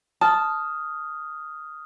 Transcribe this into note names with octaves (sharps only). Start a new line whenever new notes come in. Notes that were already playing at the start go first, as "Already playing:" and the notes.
A5 D#6 F6